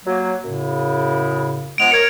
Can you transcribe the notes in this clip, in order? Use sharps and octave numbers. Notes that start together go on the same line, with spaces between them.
F#3 A#3
F#2 A2 C#3
F3 G#3 B3 D7 F7
A#4 C#5 G#6 C#7